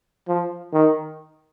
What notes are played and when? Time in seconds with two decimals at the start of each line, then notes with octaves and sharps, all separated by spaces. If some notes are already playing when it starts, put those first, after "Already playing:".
0.28 F3
0.73 D#3